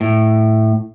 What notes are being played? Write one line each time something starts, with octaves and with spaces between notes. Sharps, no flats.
A2